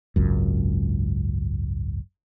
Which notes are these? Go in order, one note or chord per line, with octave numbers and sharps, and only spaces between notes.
G#1 C#2 F#2